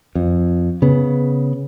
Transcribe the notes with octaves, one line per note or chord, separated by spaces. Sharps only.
F2
C#3 B3